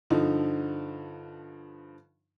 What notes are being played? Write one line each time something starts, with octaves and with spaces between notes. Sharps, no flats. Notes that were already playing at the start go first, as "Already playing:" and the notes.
G2 D3 F3 D#4